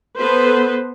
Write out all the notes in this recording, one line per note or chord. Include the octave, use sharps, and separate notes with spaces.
B3 A4 B4 C5